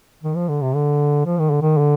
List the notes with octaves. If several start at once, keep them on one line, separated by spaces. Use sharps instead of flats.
D#3
F3
D3
C3
D3
F3
D#3
D3
D#3
D3